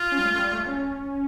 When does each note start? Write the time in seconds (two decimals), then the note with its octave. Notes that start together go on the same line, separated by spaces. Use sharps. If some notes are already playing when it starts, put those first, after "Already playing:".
Already playing: F4
0.12 C#4
0.19 G3
0.25 A3
0.39 G3
0.52 A3
0.66 C#4